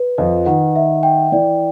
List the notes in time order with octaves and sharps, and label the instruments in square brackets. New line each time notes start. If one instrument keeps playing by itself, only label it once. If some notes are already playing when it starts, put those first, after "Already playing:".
Already playing: [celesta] B4
[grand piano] F2 F3 [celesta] D#5
[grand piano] D#3 [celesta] F#5
[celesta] E5
G5
[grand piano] E3 [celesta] D5